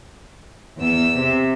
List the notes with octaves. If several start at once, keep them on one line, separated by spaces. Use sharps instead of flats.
E2 E6
C3